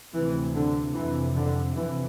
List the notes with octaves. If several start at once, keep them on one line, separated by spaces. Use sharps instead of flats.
D2 C3 E3
D3
F2 C3 E3
D3
F2 C3 E3